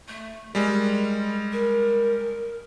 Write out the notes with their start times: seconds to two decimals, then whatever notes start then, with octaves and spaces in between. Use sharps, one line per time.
0.08 A3
0.55 G3 G#3 A#4
1.52 A#4